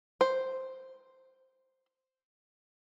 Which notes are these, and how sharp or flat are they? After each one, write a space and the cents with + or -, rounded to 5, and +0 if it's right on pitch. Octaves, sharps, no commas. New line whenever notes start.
C5 +0